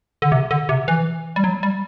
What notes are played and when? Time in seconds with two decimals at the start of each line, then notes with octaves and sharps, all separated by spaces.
0.22 D3
0.32 C3
0.51 D3
0.69 C3
0.88 E3
1.36 G3
1.44 F#3
1.63 G3